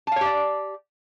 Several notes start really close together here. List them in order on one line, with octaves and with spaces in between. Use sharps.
A5 F5 C#5 G4 D5